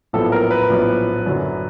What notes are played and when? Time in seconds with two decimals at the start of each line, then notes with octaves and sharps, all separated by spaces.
0.13 A#1 A2 F#3 B3 A4
0.32 A#4
0.51 B4
0.70 A#1 A2 F#3 B3
1.26 F#2 D3 F#3